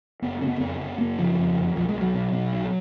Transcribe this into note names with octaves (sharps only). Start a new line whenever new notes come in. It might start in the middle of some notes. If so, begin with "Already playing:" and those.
F#1 B3
C#3 C#4
B3
F2 B3
F#1
F#1 A#3
C#3 F3
F2
F#1
B1 F3
G#3
B1
F#3
B2
B2
B1